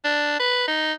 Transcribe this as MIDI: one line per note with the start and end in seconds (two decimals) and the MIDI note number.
0.04 0.38 62
0.39 0.67 71
0.68 0.93 63